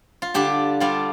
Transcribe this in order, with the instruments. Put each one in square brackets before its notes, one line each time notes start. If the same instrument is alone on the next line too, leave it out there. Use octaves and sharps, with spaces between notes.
[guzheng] F4
D3 G3 D4 G4
D3 G3 D4 F4